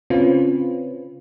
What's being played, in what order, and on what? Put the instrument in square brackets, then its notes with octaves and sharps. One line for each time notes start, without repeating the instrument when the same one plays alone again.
[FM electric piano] C#3 C4 C#4 F4 B4